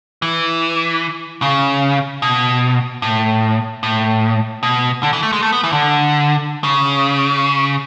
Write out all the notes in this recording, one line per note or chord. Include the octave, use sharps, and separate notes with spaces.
E3
C#3
B2
A2
A2
B2
D3
E3
A3
G#3
A3
B3
E3
D3
C#3